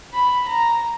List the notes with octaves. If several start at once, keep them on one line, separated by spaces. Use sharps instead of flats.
B5
A#5